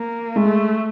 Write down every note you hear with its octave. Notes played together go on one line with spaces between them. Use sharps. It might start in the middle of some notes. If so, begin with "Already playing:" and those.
Already playing: A#3
G#3 A3